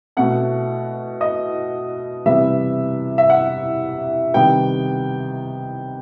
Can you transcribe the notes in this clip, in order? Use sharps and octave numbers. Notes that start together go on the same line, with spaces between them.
B2 A3 F#5
D#5
C3 E3 G3 B3 E5
E5
F#5
C3 D#3 G3 B3 G5